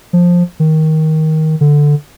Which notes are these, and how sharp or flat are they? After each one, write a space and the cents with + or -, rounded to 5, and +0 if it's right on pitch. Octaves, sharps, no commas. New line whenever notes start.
F3 +10
D#3 +15
D3 +0